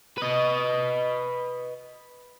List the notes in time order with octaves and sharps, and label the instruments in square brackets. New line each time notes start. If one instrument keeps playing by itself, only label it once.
[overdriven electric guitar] B4 D#5